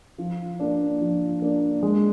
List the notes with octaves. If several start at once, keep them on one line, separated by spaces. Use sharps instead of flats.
F3
A#3 D4
F3
A#3 D4
G#3